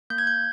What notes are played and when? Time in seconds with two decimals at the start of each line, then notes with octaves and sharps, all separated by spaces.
0.10 A#3 G6
0.18 G#6
0.27 G6